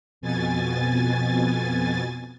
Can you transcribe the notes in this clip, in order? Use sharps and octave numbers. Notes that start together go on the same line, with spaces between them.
F2 B2 G#5 A6